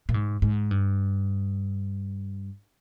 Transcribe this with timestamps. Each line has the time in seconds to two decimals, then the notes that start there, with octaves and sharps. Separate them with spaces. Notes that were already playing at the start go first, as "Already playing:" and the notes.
0.09 A#2
0.14 G#2
0.42 G#2
0.71 G2